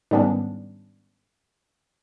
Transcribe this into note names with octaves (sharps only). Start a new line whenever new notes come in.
G#2 D#3 G3 B3 C#4 D4